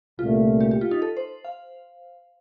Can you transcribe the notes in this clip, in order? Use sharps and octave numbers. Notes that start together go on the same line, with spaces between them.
C2 A#2 A3 F4
G4
G4
F4
D#4
A4
C5
F5